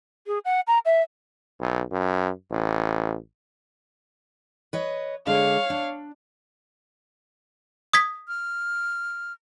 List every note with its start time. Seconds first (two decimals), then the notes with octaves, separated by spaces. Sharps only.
0.27 G#4
0.45 F#5
0.67 A#5
0.85 E5
1.60 B1
1.92 F#2
2.51 A1
4.73 B4 C#5 D#5
5.27 D3 G#3 D4 C#5 F5
5.70 D4
7.93 D#6 G#6 B6
8.28 F6